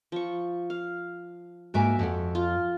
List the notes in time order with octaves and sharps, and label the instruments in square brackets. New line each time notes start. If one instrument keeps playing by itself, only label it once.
[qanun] F3 C#6
F5
[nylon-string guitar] G#2 A#3 G#5 [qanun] F#4 E5 D6
[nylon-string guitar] F2 F#5
[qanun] F4